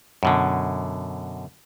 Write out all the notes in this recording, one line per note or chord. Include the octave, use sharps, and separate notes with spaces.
F#2 B2 D3